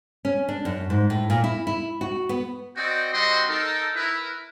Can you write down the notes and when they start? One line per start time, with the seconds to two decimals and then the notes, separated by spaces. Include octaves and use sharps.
0.25 C#4
0.48 D4
0.65 F#2
0.90 G#2
1.10 A2
1.30 A#2
1.44 E4
1.67 E4
2.01 F#4
2.29 B3
2.77 C4 F#4 D5 D#5 G5
3.13 G3 C4 D4 F#4 D#5 C6
3.49 D#4 A4 A#4
3.95 E4 A#4 B4